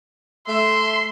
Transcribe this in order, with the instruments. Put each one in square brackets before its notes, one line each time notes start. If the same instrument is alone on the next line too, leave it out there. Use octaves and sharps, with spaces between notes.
[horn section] A3 E5 [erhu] C6